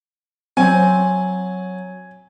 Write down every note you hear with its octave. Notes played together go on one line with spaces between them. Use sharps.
F#3 C4 G#5